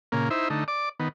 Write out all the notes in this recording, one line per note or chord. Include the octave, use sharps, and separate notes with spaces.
A#2 C#3 A#3
D#4 E4 C5 E5
D3 A3 D#4
D5 D6
D#3 B3